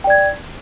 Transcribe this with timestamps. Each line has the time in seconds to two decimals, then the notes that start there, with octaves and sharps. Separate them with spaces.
0.04 G5
0.07 D5
0.10 G#6